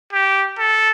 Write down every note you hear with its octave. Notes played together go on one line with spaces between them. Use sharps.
G4
A4